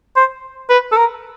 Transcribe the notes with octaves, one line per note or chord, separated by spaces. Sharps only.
C5
B4
A4
A#4